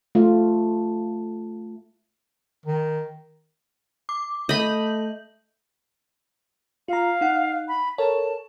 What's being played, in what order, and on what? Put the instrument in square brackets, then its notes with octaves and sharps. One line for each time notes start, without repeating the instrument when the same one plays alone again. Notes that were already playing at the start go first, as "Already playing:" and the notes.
[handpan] A3 F4
[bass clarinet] D#3
[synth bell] D6
[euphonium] A3 [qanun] D#5 B5 [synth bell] G6 F#7
[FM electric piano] F4 A#5 [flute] F5
[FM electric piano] D#4 F#5
[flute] B5
[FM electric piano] A4 A#4 C#5 [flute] A5